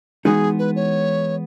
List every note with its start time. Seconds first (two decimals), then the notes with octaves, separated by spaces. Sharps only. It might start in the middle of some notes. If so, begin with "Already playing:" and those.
0.25 E3 G#3 B3 D#4 F#4 G#4
0.59 B4
0.76 C#5